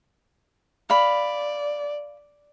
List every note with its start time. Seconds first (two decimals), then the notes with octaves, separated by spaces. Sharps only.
0.90 D5 F5 B5